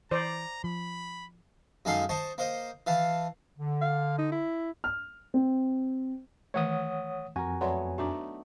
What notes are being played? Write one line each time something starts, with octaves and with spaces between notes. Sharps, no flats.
E3 C5 D5 A#5
F3 B5
F#2 G#3 D#4 A4 F5 C6
C5 D#5 A5 C#6
A#3 C5 D#5
E3 F5 A5
D3
F5
D#4
E4
F6
C4
D#3 E3 A3 C#5 F#5 D#6
F2 F#4 A#4 G#5
F#3 A3 B3 D5 C6
A3 D4 D#4 F#4 D5